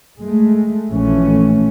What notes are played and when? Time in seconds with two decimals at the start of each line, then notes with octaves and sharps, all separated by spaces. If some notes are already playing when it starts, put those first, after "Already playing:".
0.20 G#3 A3
0.90 A#1 E3 A3 C#4